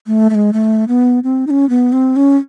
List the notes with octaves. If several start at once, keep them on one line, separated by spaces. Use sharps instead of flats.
A3
A3
G#3
A3
B3
C4
D#4
C#4
B3
C4
C#4